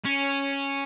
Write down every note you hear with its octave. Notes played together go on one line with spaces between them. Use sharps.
C#4